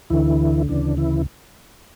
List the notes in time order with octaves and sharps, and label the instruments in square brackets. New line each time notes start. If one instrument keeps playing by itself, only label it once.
[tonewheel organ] D2 D3 E3 E4
D2 C#3 E3 D4
E3 E4